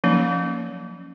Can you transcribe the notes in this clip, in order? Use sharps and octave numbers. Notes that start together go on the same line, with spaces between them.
F3 F#3 A#3 C#4 D#4